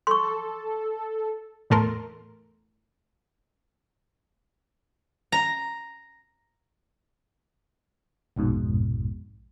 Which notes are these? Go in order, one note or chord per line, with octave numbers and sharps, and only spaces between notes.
A4 C6 C#6
E2 A2 A4 A#4 C6
A#5
A#1 F2 G#2 B2